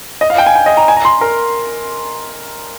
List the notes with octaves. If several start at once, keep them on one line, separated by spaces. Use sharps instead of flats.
D#5
F5
G5
G#5
G5
D#5
A#5
G#5
A#5
C6
A#4